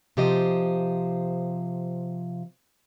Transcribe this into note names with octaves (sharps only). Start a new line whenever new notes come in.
C3 F3 G4 C5 D#5